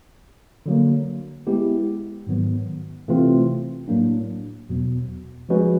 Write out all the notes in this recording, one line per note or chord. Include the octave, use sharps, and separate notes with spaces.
D3 F#3 A#3
G#3 B3 E4 G4
G#2 D#3 F#3 B3
C3 E3 A3 C4 F4
A2 F#3 A#3 D4
E2 B2 F#3 B3
F3 G#3 C#4 F#4 B4